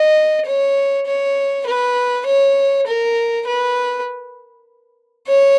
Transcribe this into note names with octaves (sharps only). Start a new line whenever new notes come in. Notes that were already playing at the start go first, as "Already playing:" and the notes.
Already playing: D#5
C#5
C#5
B4
C#5
A#4
B4
C#5